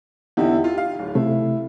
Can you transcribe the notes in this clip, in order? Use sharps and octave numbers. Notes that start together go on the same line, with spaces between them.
E2 D3 D#4 E4 G4
F4
F5
D1
C3 A3 E4